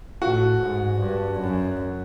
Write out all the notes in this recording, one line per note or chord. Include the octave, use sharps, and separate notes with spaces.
A2 F#4
G#2
G2
F#2